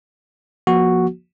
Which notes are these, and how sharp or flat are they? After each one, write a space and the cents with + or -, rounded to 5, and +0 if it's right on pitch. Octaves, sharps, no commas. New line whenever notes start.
F3 +15 A#3 +40 F#4 +0